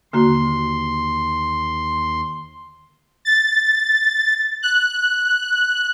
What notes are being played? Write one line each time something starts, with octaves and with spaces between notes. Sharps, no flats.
D#2 D3 A#3 F#4 C6
A6
F#6